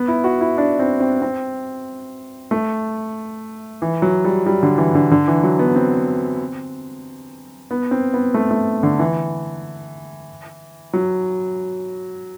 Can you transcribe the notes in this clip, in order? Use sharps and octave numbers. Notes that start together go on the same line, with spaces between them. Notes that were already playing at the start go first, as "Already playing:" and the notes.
Already playing: B3
E4
F#4
E4
D4
C4
C4
C4
A3
E3
F#3
G3
G3
D3
E3
D3
D3
E3
F#3
B3
C4
B3
C4
B3
A3
A3
D3
E3
F#3